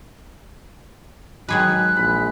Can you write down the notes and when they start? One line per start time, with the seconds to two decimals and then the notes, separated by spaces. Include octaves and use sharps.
1.49 D#3 F#3 G#3 G#4 B4 F#6
1.96 A#1 B5